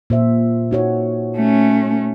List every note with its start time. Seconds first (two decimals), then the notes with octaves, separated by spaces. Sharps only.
0.10 A#2 C5 E5
0.71 D#4 F#4 C#5
1.36 A3 C#4